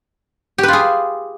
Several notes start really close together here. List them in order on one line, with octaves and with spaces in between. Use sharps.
G4 B4 F4 G#4